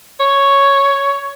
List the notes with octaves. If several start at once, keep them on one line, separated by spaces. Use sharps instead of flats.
C#5